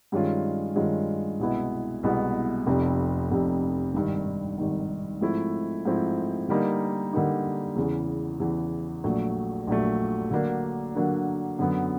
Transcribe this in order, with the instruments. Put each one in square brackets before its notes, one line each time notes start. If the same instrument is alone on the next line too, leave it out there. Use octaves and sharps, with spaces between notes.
[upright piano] G2 D#3 G#3 C#4 F4
G2 D#3 G#3 C#4 F4
C2 B2 G#3 B3 E4
C2 B2 G#3 B3 E4
F1 F2 C3
F1 F2 C3
G#1 G2 D#3
G#1 G2 D#3
G#2 F3 A3 C4 E4
G#2 F3 A3 C4 E4
D3 G3 A#3 D#4
D3 G3 A#3 D#4
E2 C#3 E3
E2 C#3 E3
A#1 A#2 F#3 A3
A#1 A#2 F#3 A3
D3 F#3 A#3 D4
D3 F#3 A#3 D4
F#2 D3 F#3 B3